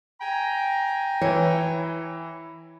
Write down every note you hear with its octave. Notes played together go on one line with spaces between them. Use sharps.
G5 G#5 A#5
E3 E4 C#5